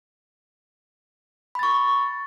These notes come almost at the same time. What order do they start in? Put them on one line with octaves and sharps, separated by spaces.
B5 A6 C#6